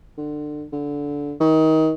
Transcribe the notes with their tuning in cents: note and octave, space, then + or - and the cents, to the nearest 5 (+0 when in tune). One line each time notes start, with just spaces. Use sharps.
D3 +25
D3 -20
D#3 +25